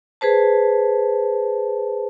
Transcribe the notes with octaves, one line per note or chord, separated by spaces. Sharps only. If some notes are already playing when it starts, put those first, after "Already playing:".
G#4 B4 C5 A5